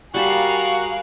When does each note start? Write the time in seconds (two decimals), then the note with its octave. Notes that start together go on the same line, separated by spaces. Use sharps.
0.14 G3 F#4 G#4 A#4 F5 A5 B5